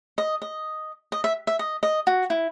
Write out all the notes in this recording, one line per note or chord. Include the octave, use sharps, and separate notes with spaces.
D#5
D#5
D#5
E5
E5
D#5
D#5
F#4
E4